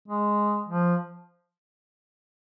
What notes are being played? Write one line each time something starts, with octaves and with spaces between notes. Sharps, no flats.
G#3
F3